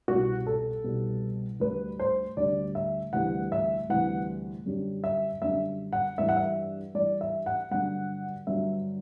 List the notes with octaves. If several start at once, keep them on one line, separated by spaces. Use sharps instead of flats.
C2 B2 G3 F#4
A4
C2 B2 G3
D2 D3 G3 B4
C5
D2 D3 G3 D5
E5
D2 C3 E3 G3 F#5
E5
D2 C3 E3 G3 F#5
F#2 D3 G3
E5
F#2 D3 G3 E5
F#5
G2 E3 G3 E5
F#5
E5
G2 E3 G3 D5
E5
F#5
G2 D3 F#3 F#5
G2 D3 F#3 E5